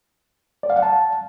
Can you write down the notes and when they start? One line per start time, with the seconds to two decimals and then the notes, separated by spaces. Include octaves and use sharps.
0.63 D5
0.70 F5
0.76 F#5
0.82 A5